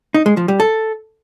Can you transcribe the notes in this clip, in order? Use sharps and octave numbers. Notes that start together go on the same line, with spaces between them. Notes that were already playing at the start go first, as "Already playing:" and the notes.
D#4
G#3
F3
G3
A4